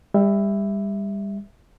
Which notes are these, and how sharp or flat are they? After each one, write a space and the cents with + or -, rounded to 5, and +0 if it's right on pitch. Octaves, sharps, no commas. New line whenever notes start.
G3 +30 E5 +0